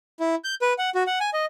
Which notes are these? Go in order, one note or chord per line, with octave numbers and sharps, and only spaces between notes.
E4
G6
B4
F#5
F#4
F#5
G#5
D#5